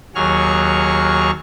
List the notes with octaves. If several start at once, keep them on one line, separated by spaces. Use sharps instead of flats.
D#2 F#3 G#4 C#6 F6